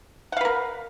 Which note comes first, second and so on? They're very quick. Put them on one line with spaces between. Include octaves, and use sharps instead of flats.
F#5 F5 B4 A#4